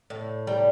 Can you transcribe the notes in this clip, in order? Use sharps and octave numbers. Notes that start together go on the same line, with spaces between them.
A2
G3